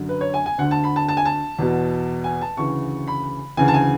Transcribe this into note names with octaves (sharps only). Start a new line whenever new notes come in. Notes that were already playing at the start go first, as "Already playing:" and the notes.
Already playing: F#2 D3
B4
C#5
G#5
G#5
D2 D3 F#5
A5
B5
A5
A5
G#5
A5
E2 B2
G#5
A5
D2 C#3 E3 C#6
B5
D2 C#3 E3 G#5
A5
G#5